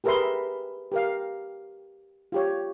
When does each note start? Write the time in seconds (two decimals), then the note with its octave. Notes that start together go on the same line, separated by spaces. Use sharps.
0.04 G4 G#4 A#4 B4 E5 C6
0.92 G4 A#4 F5
2.32 F4 G4 C#5